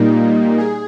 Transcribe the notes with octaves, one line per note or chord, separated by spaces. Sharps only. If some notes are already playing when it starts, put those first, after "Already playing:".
Already playing: A#2 G3 A#3 D#4
G#4